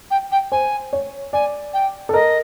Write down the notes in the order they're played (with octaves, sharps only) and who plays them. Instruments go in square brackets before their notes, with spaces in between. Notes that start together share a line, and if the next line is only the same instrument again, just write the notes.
[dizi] G5
G5
[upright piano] C5 [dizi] G#5
[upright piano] C#5
[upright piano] D5 [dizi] G#5
[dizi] G5
[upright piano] A4
[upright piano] A#4 [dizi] D#5